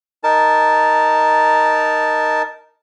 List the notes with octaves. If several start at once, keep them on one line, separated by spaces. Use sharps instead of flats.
D#4 A#4 A5